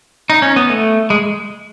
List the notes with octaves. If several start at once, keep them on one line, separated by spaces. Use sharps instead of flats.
D#4
C#4
B3
A3
G#3